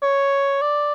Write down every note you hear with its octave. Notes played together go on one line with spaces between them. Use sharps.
C#5
D5